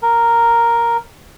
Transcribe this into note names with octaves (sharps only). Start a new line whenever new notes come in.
A#4